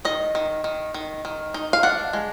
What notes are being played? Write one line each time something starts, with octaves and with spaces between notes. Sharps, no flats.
D#3 D#5
D#3
D#3
D#3
D#3
D#4
F5
D4 F#5
G#3